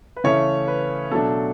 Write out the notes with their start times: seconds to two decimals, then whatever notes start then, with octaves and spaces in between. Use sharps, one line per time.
0.16 B4
0.24 C#3 E3 A3 C#4 E4 C#5
0.68 B4
1.11 B2 F#3 A3 D4 A4